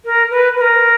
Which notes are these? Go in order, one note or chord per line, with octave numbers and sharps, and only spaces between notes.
A#4
B4
B4
A#4